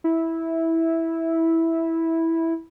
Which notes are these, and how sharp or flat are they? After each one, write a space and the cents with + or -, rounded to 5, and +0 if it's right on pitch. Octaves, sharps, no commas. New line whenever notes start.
E4 -10